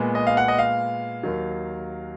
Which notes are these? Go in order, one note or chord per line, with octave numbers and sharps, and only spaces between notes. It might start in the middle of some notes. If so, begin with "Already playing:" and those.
Already playing: A#2 G#3 B3
D#5
F5
F#5
D#5
F5
D#2 D#3 F#3